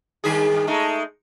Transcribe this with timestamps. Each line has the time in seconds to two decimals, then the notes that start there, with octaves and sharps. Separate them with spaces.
0.24 G2 D#3 G#4
0.67 G#3 A3 D#4